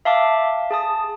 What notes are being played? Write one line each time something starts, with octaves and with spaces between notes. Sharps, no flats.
E5 F5 A5 D6
G#4 A5 D#6